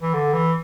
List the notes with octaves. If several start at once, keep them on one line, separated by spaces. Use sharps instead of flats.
E3
D3
E3